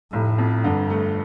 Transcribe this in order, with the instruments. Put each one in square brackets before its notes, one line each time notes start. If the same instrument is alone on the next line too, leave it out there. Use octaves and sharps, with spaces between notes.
[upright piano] F1 [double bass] A2
[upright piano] F2
[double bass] G2 [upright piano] D3
[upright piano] A3